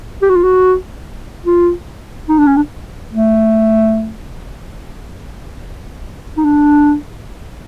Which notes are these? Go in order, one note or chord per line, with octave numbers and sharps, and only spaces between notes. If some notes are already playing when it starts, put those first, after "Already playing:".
G4
F#4
F4
F#4
F4
D#4
D4
C#4
D4
A3
D#4
D4